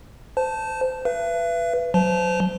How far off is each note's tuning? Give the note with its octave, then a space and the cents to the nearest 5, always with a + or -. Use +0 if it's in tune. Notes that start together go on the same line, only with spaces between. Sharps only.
C5 -25 A5 +0
B4 +0 E5 +45
F#3 -10 C5 -35 A5 -25